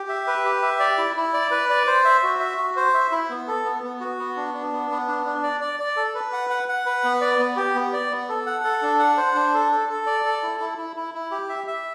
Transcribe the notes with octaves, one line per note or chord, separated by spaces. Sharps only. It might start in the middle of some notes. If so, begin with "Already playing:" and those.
Already playing: G4
E5
B4
G4
E5
D5
E4
E4
D5
B4
D5
C5
E5
F#4
E5
F#4
C5
E5
E4
B3
A4
B3
B3
F#4
B3
D4
D4
B3
B3
D4
D4
D5
D5
D5
A4
B4
F#5
F#5
F#5
B4
B3
D5
B3
G4
B3
D5
B3
A4
F#5
A4
D4
F#5
C5
D4
A4
A4
A4
D5
A4
E4
E4
E4
E4
E4
G4
E5
E5